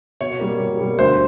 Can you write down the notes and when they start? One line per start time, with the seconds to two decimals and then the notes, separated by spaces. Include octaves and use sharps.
0.21 B2 C#5
0.39 G3 A#3
0.60 B2
0.79 G3 A#3
0.98 D2 C5